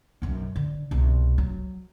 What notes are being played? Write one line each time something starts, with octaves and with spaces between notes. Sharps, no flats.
B1 F#2
D3
C2 B2
F#3